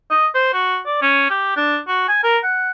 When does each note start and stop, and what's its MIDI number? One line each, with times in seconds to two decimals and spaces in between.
0.10 0.27 75
0.35 0.50 72
0.53 0.79 66
0.86 0.99 74
1.02 1.27 61
1.30 1.54 67
1.57 1.79 62
1.88 2.03 66
2.08 2.21 80
2.24 2.38 70
2.44 2.71 78